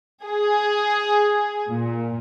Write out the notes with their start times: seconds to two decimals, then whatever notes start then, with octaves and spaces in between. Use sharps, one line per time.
0.25 G#4
1.69 A#2